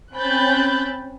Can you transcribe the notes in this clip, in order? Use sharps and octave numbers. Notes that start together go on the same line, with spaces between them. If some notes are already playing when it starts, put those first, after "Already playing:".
C4 C#4 B5 F#6 G6 A6